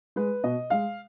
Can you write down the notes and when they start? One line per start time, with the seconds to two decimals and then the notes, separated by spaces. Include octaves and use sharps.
0.16 G#3 B4
0.44 B2 D#5
0.70 G#3 F5